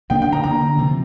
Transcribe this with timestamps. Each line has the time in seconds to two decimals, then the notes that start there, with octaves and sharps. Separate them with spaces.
0.10 D3 A#3 D4 G5
0.22 G5
0.33 A#5
0.44 D3 A#3 D4 A#5
0.78 C3 F3 C4